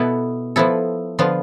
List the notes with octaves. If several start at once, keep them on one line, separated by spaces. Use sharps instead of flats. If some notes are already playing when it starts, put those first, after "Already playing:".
Already playing: B2 B3 E4 A4
F3 B3 E4 A4
D3 F3 B3 F4